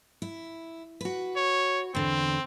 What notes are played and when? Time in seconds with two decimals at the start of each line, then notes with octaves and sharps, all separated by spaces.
0.22 E4
1.01 F#4 B4
1.36 C#5
1.95 E2 D3 C4